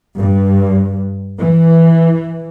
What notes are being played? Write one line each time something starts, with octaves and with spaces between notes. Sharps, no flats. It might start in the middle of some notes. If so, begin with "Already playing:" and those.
G2
E3